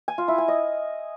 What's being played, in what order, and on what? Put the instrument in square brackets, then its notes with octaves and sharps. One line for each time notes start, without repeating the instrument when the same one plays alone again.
[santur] G#5
F4
E4
G#5
D#5